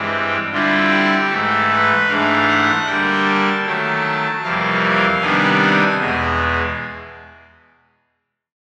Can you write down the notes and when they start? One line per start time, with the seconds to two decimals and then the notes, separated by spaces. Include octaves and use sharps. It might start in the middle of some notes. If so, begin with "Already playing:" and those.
Already playing: G2 E3 G#3 C4
0.52 D3 G3 C4 E4 F4
0.92 G4
1.30 G#2 E3 A3 A4
1.70 B4
2.08 G#2 E3 A3 D4 F5
2.48 F#5
2.86 D3 G3 A#3 G5
3.26 A5
3.65 D#3 F#3 A3
4.43 F2 C3 E3 G3 A#3 F5
4.82 F5
5.21 C3 D#3 G3 B3 D4 G#5
5.99 E2 B2 G#3